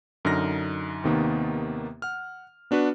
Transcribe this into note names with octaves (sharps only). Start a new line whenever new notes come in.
F#2 D3 D#4 F6 A#6
D#2 C3 D#3 A#3 B3
F#5 F6
B3 D4 F#4 B4